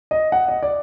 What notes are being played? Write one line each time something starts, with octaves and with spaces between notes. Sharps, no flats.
D#5
F#5
D#5
D5